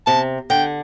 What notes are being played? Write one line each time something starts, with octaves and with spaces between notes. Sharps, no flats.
C3 A5
D3 G5